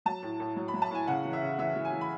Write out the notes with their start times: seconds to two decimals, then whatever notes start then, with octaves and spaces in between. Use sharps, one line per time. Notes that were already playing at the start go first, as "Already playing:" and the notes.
0.06 F#3 A5
0.23 A2
0.40 A2
0.56 F#3
0.68 B5
0.74 F#3
0.82 A5
0.91 A2 G#5
1.07 C#3 F#5
1.25 E3
1.33 E5
1.42 C#3
1.59 E3 E5
1.76 E3
1.85 G#5
1.92 E3
2.01 B5